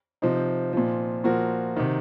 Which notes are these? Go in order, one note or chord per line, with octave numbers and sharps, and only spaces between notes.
C3 F3 C4 D#4
A#2 F3
A#2 F3 F#4 A#4
C3 D#3